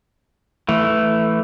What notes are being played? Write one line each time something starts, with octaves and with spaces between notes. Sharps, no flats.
E3 A3